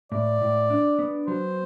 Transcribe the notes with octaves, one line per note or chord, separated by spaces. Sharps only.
A2 D5
A2
D4
B3
F#3 C5